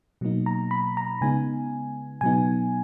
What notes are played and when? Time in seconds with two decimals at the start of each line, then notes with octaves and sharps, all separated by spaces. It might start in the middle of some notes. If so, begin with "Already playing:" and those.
0.21 B2 F#3 A#3 D#4
0.46 A#5
0.71 B5
0.97 A#5
1.21 C#3 G#3 B3 D#4 G#5
2.21 B2 F#3 B3 D#4 G#5